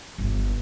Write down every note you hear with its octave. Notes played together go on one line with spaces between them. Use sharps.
G1